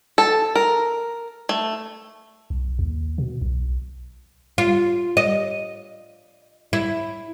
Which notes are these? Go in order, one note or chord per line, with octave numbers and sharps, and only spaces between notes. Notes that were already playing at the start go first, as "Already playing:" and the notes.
A4
A#4
A3
B1
D#2
B2
B1
F4
D#5
E4